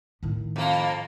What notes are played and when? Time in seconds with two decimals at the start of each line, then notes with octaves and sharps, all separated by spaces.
0.23 A2 D#3
0.56 F2 A#3